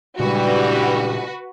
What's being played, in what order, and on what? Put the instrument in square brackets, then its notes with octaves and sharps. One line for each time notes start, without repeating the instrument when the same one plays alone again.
[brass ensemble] G2 E3 G3 [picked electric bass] A#2 C#3 G#3 [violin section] F#4 B4